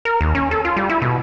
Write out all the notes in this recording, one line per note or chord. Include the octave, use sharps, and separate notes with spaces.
A#4
D#2
C#4
A4
F4
G3
E4
B2